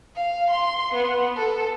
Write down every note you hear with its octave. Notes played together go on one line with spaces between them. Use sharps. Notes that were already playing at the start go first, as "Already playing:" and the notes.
F5
C6
B3
A4